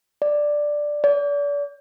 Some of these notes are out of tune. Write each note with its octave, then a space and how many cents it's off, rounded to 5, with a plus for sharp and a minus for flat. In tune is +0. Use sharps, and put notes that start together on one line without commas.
D5 +5
D5 -35